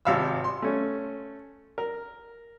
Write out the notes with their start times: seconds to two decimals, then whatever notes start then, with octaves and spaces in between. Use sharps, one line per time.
0.05 G#1 C3 F5 B5 E6
0.44 C6
0.62 A3 C#4
1.78 A#4